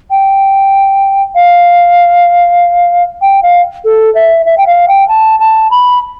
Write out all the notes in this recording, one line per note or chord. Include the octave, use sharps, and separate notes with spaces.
G5
F5
G5
F5
A4
E5
E5
G5
F5
G5
A5
A5
B5